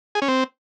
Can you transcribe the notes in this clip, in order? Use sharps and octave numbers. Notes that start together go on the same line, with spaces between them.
G#4
C#4
C4